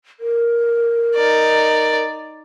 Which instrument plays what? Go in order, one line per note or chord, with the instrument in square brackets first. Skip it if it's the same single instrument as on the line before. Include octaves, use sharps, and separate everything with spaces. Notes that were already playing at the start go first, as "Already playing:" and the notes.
[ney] A#4
[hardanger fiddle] D#4 D5